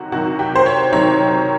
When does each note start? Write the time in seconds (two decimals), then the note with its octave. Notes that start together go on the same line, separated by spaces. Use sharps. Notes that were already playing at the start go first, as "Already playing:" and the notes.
Already playing: C3 D#3 F#3 F#4
0.12 C3 D#3 F#3 F#4
0.39 G4
0.56 C5
0.66 C#5
0.92 C3 D#3 F#3 C#5